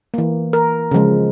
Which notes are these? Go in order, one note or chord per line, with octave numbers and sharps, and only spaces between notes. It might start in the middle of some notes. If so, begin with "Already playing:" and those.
E3 A#3
A#4
C#3 F3 G#3